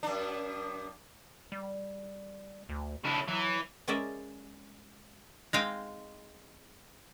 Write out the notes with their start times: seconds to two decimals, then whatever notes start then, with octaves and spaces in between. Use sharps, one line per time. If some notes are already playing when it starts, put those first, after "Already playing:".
0.03 F#2 D4
1.52 G3
2.69 D2
3.05 C#3 D4 E4
3.28 E3 F#3
3.88 G#3 C#4 A#4 D5 E5
5.53 G#3 C4 D#4 F5 G5 G#5